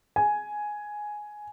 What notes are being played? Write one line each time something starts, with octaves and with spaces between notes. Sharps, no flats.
G#5